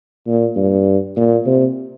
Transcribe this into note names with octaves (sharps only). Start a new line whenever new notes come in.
A#2
G2
A#2
C3